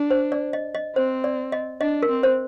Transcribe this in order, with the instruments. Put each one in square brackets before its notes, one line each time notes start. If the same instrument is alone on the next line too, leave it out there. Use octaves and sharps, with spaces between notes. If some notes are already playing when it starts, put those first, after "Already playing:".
Already playing: [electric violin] D4
[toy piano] C5
D5
D#5
D#5
[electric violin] C4 [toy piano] C5
[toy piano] D5
D#5
[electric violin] D4 [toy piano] D#5
[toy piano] A#4
[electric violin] C4
[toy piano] C5